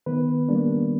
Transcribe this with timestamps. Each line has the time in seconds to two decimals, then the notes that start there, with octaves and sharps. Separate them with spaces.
0.06 D#3 B3 B4
0.49 G3 A#3 D4